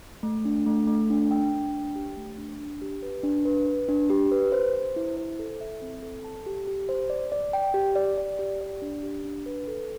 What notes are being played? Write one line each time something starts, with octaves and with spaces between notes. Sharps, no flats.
A3
D4
A3
A3
D4
G5
D4
G5
G4
A3
D4
D4
G4
B4
D4
B4
B4
D4
G4
B4
C5
C5
E4
C5
A4
E5
C4
A4
A5
G4
G4
C5
D5
D5
G5
G4
D5
D5
G4
D5
D4
G4
D4
B4
A4